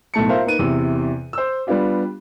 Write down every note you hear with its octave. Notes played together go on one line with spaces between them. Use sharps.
B1 A2 A3 A5 C#7
F4 A#4 C5 E5 F5
A#3 D#4 B4 D#7
E2 C3 E4
C5 E6
G3 B3 D4 F4 G4